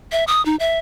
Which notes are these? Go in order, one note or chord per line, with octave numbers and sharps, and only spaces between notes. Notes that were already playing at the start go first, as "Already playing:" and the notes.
E5
D#6
D#4
E5